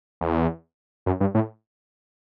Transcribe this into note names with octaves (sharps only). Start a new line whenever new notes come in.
E2
F#2
G2
A2